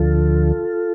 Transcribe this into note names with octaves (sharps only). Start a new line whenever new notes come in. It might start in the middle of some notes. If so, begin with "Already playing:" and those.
Already playing: D2 D3 F3 F4 A4